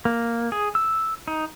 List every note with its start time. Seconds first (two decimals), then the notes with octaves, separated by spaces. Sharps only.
0.05 A#3
0.52 G#4
0.75 E6
1.28 D#4